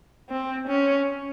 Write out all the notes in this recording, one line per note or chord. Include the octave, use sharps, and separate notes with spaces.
C4
C#4